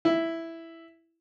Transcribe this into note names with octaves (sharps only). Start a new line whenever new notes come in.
E4